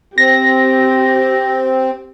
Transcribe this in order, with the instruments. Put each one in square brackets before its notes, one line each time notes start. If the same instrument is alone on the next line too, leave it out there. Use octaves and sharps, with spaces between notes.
[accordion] C4 [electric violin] G4 [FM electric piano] A#6